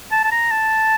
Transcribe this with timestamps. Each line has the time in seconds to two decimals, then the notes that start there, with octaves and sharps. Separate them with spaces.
0.12 A5
0.24 A5
0.32 A#5
0.51 A5